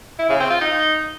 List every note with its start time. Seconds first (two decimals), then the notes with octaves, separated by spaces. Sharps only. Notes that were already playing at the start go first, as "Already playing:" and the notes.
0.19 E4
0.29 C#3
0.40 C4
0.50 F4
0.61 D#4